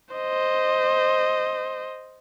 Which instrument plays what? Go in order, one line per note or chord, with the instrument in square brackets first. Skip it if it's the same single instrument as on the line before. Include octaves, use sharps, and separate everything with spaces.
[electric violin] C5 D#5